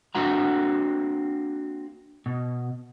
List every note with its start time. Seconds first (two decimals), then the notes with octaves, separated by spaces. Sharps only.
0.15 A#3 C4 D4 F#4 F#5 A#5
2.26 B2